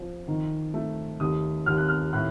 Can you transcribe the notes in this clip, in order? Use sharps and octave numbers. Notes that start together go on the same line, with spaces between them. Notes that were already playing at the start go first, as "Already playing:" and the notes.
Already playing: F3
D#3
A3
D#2 D#6
D#2 F6
F#6
F6
A2 F#6